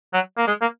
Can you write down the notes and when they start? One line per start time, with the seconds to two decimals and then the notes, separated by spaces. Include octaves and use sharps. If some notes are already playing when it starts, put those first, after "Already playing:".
0.14 F#3
0.38 A#3
0.48 G#3
0.62 A#3